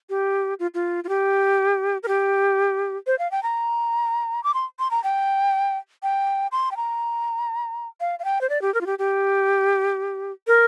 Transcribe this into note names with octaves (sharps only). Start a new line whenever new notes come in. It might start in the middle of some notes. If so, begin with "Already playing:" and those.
G4
F4
F4
F4
G4
A#4
G4
C5
F5
G5
A#5
D6
C6
C6
A#5
G5
G5
C6
G5
A#5
F5
F5
G5
C5
D5
G4
A#4
F4
G4
G4
A#4